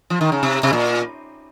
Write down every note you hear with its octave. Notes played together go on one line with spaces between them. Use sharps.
F3
D#3
C#3
C3
C3
A#2